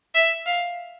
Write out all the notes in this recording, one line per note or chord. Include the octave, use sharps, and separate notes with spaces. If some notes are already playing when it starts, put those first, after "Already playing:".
E5
F5